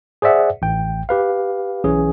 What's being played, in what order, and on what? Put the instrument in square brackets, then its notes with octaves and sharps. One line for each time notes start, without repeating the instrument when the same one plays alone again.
[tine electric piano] G#4 C5 D5 E5 F#5
A1 G5
G4 B4 F5
B1 E3 C#4 G#4